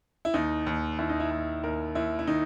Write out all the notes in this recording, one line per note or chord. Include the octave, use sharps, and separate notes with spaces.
E4
D#2 D#4
D#2
D#2 E4
D#4
E4
D#2
D#2 A#4
D#2 E4
E4
D#3 D#4